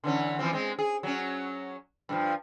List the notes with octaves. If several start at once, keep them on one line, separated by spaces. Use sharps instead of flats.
D3 E3 C#4
E3 F3 C4
G#3 C4
G#4
F#3 C#4
G2 D3 F3